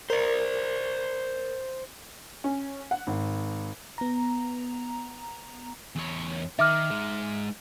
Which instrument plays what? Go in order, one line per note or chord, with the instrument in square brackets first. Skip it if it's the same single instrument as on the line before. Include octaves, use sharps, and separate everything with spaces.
[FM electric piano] A#4 [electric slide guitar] C5 D5
[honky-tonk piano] C#4
F#5
G#1
[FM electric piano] B3 A#5
[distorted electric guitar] E2 C#5
[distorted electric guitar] D#3 D#4 [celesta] E5 D6 F6
[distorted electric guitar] G#3 D#4